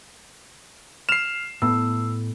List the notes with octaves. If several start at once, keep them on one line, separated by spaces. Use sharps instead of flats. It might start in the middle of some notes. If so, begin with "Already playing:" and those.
F6 C7 E7 F7
A2 B3 E6